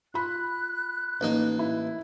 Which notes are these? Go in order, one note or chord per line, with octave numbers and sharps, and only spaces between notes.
F4 B5 F#6
A1 A#3 D#4
E4